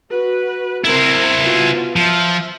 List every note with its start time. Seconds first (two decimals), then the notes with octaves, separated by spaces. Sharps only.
0.11 F#4 B4
0.84 C4 E4 A#4 C5 A#5
1.41 B3 F4 F#4
1.96 F3 E5